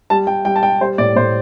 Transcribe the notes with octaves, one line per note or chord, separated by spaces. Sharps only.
G3 A5
G3 G5
G3 G5
A5
G3 G5
G3 C5
A2 D5
A2 C5